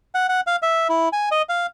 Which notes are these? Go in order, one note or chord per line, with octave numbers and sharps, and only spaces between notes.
F#5
F#5
F5
E5
E4
G#5
D#5
F5